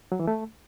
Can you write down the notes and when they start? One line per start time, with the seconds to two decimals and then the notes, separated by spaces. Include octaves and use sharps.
0.12 F#3
0.20 E3
0.27 A3